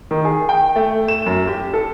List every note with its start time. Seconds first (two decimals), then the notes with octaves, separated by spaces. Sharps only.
0.11 D#3
0.25 G#4
0.49 G5
0.76 A3
1.08 E7
1.26 F#2
1.47 G4
1.74 A4